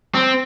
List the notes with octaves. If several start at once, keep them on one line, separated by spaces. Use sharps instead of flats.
C4